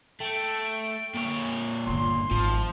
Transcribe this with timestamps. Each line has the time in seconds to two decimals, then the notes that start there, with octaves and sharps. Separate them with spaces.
0.20 A3 G5
1.15 A#2 C#5
1.87 G1 D3 C6
2.31 G#1 F3